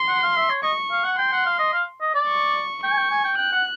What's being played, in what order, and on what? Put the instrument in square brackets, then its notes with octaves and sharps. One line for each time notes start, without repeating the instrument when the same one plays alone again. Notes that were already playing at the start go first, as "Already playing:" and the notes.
Already playing: [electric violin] C6
[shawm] F#5
F5
E5
C#5
[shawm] D#5 [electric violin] C#6
[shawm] F5
F#5
[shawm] G5 [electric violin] C6
[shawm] F#5
F5
D#5
F5
D#5
D5
[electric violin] C#6
[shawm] G5 [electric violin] C#6
[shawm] G#5
G5
G#5
G5
[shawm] G5 [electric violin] F#6
[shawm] F#5